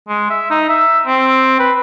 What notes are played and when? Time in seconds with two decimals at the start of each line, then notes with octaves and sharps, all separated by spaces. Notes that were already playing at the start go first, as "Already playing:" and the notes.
0.09 G#3
0.30 E5
0.50 D#4
0.69 E5
1.06 C4
1.59 B4